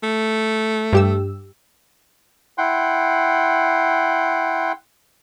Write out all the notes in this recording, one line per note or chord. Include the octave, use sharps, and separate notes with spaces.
A3
G2 G4 E6
E4 F#5 G5 C6